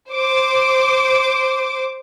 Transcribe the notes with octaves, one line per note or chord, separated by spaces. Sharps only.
C5 D6